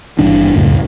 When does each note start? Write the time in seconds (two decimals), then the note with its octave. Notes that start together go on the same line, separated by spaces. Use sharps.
0.19 G#1 G2 E3 D4
0.55 C#2 F#2 A2